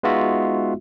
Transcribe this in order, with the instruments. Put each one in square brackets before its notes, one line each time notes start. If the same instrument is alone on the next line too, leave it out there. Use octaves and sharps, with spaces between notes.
[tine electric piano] G#3 B3 D#4 F4 F#4 E5